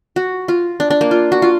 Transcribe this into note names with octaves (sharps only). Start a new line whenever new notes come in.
F#4
F4
D4
D4
A#3
F4
F#4
F4